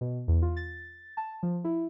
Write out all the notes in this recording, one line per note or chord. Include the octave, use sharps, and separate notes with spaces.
B2
E2
F4
A6
A5
F3
E4